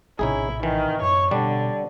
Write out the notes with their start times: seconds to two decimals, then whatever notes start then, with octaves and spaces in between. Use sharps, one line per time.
0.19 A#1 A2 C3 C#4 D#4 E4 G#4
0.63 D#3 E3
1.02 F#2 C#5
1.31 B2 D3 G3 D4